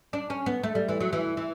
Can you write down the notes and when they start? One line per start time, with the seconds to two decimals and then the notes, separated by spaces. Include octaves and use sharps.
0.13 D4
0.30 C#4
0.46 B3
0.63 A3
0.75 G3
0.89 E3
1.00 F#3
1.13 E3
1.37 E3